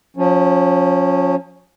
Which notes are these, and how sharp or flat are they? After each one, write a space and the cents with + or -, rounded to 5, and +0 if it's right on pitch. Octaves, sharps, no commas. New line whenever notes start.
F3 +35 C#4 +0